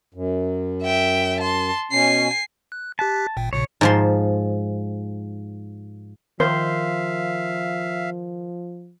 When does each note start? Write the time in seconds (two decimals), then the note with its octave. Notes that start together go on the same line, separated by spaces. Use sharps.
0.14 F#2
0.83 E5 G5
1.40 A5 C6
1.92 B2 C#4 G#5 C7
2.72 F#6
2.99 G4 A5 F#6 B6
3.37 G#1 A#2 G5
3.53 A#1 A#2 C#3 C#5
3.81 G#2 F3 C6
6.40 D#3 F3 C5 E5 F5